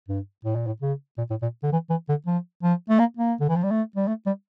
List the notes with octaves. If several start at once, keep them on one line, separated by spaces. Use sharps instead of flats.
G2
A2
A#2
A2
C#3
A#2
A2
A#2
D3
E3
E3
D3
F3
F3
A3
A#3
A#3
D3
E3
F3
G3
A3
G3
A3
G3